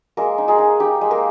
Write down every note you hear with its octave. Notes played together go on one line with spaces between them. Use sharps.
G#3 A#3 A#4
D#4
G#3 G#4
D#4
D#4 G4
G#3
A#3 A#4